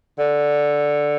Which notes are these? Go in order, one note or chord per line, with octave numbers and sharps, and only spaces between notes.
D3